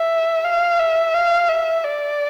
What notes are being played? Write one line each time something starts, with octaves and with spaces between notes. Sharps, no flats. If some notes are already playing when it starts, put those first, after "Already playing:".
Already playing: E5
F5
E5
F5
E5
D5